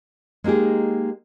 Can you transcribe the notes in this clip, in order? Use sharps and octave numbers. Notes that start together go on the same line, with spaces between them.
G#3 A#3 D#4 G4 G#4